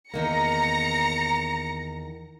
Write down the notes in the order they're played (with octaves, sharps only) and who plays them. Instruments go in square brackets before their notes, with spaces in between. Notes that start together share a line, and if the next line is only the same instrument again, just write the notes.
[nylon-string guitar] E2 D#3 A#3 [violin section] A#5 A#6 C#7